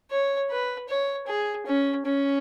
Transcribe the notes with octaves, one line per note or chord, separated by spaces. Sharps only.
C#5
B4
C#5
G#4
C#4
C#4